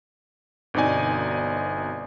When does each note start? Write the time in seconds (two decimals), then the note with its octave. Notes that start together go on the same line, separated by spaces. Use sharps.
0.74 G1 B2 C4 D#4 D5 G#5